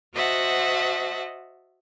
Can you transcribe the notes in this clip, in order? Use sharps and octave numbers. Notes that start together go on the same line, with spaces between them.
F#4 C5 D#5 E5 F#5 A5